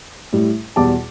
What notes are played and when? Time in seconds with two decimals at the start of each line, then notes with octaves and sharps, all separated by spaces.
0.33 A2 G3
0.76 E2 B2 G3 A5 D6